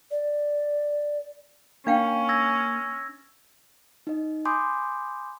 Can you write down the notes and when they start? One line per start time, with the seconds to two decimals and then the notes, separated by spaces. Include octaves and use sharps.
0.11 D5
1.87 A#3 C#4 D4 F5 G5
2.29 E6 G#6 A#6
4.07 D#4 D#5
4.45 G#5 B5 C6 D6 D#6 G6